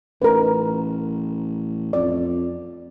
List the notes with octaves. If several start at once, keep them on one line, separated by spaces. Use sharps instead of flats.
A1 A#4 B4
F2 D5